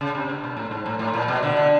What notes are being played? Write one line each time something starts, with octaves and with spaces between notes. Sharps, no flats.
C#3
C3
B2
A#2
A2
G#2
A2
A2
A#2
B2
D3
D3